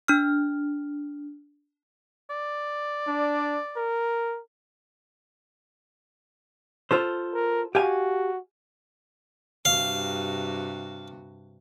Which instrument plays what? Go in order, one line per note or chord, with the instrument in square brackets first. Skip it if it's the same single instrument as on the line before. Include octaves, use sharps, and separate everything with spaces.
[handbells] D4 F6
[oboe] D5
[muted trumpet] D4
A#4
[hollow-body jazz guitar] F4 A4 C5
[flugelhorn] A#4
[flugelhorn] F#4 [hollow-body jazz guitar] G4 F5 G#5
[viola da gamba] G2 C3 F#4 [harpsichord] F5